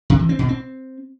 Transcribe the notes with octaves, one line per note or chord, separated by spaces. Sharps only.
C3
E3
C4
B2
C4